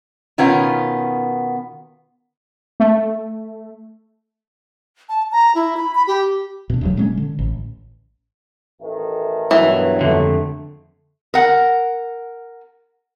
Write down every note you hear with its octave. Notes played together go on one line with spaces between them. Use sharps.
B2 D#3 B3 C#4 F4
A3
A5
A#5
E4
B5
B5
G4
B2 D4
D1 D2 F#3
A#2 G#3 A#3 C#4
D3
A1
A1 D#3 A3
G2 B2 E3 F#3
F2 D3 A3
A#4 F#5